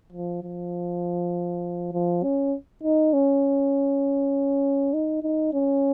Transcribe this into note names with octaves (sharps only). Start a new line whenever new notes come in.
F3
F3
F3
C#4
D#4
C#4
D#4
D#4
C#4